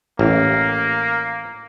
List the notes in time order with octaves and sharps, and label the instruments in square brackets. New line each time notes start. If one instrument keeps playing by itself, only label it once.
[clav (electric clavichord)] A1 [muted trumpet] A#3